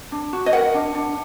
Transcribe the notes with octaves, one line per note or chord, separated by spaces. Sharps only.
D4
F#4
D#5
A#4 F#5
D4
D4